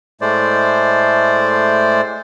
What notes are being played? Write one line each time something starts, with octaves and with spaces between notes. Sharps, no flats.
A2 G#3 A3 C5 D5